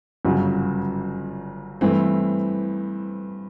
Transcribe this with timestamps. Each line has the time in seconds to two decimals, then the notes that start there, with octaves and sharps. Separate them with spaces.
0.25 G1 F#2 C#3 F#3
1.81 G2 E3 A3 C4